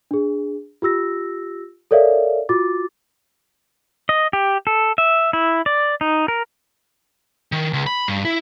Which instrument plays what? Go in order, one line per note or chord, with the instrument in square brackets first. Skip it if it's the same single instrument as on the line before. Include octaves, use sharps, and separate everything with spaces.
[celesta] D4 G#4
F4 G4 E6 A#6
A4 A#4 C#5 D5 E5 F5
F4 F#4 D6 A6
[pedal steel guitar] D#5
G4
A4
E5
E4
D5
D#4
A#4
[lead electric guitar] D#3
C#2
B5
G2
E4